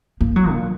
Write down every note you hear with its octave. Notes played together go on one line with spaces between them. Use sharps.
A#3
F#3
A#2